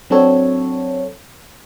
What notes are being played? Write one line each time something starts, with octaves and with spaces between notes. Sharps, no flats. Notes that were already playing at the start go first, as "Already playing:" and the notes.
F#3 C4 D4 F#4 A4 C#5